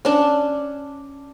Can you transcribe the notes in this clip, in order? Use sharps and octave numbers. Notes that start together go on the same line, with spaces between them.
C#4 D4